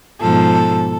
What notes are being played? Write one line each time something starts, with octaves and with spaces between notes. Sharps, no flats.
G#2 B2 F3 A4